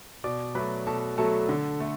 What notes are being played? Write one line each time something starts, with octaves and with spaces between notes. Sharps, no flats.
B2 D5 D6
F#3 A3 B4 B5
B2 A4 A5
F#3 A3 A4 A5
D3
A3